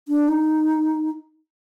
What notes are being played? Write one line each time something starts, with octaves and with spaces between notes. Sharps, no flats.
D4
D#4